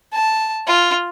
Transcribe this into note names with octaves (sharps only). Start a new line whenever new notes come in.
A5
F4